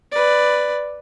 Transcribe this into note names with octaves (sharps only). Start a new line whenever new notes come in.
B4 D5